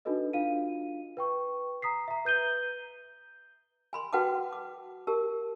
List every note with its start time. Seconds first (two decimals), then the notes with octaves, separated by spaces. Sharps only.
0.05 D4 D#4 F#4 A4 B4 D#5
0.33 D4 F4 F5 D#7
1.17 B4 G5 C#6
1.82 A#5 D#6 B6 C7
2.08 E5 A#5
2.25 B4 G6 D#7 G7
3.93 G#5 B5 C6
4.13 F#4 B4 F#5 G5 A5 D6
4.52 D6
5.07 G4 A#4 A5